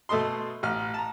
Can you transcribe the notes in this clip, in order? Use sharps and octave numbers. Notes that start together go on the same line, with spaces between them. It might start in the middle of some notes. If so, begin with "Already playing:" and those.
B2 A3 A4 D#5 C6
A1 F6
A5 A#5